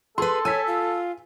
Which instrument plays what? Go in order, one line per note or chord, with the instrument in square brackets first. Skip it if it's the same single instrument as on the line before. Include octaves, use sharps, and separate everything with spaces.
[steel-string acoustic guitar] G#4 B4 [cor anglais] A4 [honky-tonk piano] C6
[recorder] C#5 [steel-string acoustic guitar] G#5 [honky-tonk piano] E6 B6
[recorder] F4